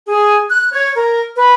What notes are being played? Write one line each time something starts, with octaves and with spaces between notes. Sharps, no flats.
G#4
F#6
C#5
A#4
B4